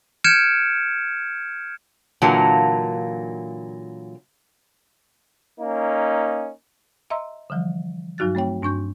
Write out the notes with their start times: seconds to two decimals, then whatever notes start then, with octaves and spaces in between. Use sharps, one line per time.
0.24 F6 G6 G#6 C#7 D7 E7
2.22 A#2 D3 E3 F#3 A#3
5.59 A#3 C#4 D#4
7.10 D#5 E5 A#5 C6 E6
7.50 D3 E3 F3 G3
8.18 G2 F#3 D#4 F#4 F#6 A6
8.35 A3 C4 C#5 G5
8.62 G2 D4 C#6 G6